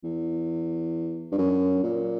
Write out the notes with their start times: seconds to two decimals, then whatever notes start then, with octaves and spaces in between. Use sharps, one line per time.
0.04 E2
1.32 G2
1.38 F#2
1.83 A#2